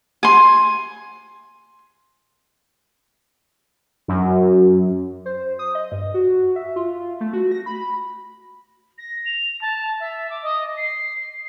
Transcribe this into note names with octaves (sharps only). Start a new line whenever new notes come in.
G#5 C6
F#2
C5
D#6
D#5
G2
F#4
E5
F4
A3
F#4
A#6
B5
A#6
F7
A5
E5
D6
D#5
C7